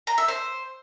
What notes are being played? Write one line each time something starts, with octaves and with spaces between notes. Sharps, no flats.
A#5
E5
C5